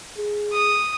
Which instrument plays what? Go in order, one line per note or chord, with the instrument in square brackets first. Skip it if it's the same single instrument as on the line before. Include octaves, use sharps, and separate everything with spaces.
[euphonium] G#4
[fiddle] D#6